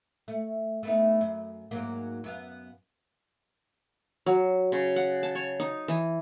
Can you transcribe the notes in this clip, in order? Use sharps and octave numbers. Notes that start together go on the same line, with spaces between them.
A3
A3 B3 D#4
F#2
G#2 F#3 A#3
F#2 B3 F5
F#3
C#3
F#5
A5
C#5
D#4
E3